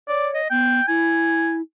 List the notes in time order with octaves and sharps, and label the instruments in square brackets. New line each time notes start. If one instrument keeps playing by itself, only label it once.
[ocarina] C#5 [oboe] D5
[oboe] D#5
[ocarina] B3 [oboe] G5
[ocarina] E4 [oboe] G#5